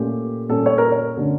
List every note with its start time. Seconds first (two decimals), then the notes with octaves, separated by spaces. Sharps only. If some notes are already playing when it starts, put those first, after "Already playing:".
Already playing: A#2 A3 C#4 G4
0.49 A#2 G3 C#4 A4
0.66 C#5
0.78 A#4
0.91 C#5
1.17 D3 A3 C#4